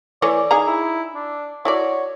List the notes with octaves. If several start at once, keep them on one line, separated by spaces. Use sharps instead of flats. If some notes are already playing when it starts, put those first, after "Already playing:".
E3 A3 C#5 D5
D#4 G#4 A#5
E4
D4
E4 F#4 C#5 D5